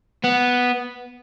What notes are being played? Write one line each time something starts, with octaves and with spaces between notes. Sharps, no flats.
B3